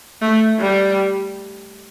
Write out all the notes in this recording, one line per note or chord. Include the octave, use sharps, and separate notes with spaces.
A3
G3